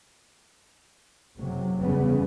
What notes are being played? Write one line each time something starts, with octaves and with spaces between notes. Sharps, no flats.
F#1 C3 F#3
F#1 E2 C#3 G3 B3